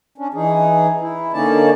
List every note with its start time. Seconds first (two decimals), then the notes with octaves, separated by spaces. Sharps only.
0.18 C#4 D4
0.34 E3 D#4 G#4
1.01 E4
1.33 D3 A#3 C#4 D#4 D5 A5